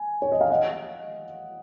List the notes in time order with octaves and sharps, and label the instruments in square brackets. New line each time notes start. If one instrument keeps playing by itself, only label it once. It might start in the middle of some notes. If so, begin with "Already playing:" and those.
Already playing: [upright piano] G#5
C#5
D#5
F5
D#5 F#5